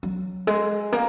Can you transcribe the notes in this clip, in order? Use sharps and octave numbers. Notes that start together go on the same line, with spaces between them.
F#3
G#3
A#3